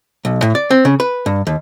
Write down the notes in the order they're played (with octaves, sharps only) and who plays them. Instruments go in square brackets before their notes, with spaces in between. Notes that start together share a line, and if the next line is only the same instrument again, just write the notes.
[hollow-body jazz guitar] B1
A2
D5
C4
C#3
B4
G2
D#2